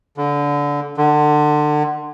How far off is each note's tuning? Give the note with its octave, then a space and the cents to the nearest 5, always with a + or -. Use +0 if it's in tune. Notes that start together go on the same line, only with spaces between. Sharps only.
D3 -20
D3 +30